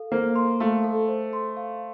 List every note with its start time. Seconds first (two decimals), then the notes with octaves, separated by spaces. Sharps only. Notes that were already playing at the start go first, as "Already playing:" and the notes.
Already playing: A4 F5
0.12 A#3 C5
0.35 C6
0.60 A3 F5
0.84 A4
1.08 C5
1.33 C6
1.57 F5